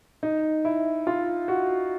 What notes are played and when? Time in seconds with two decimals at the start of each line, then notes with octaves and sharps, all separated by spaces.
0.23 D#4
0.65 E4
1.07 F4
1.48 F#4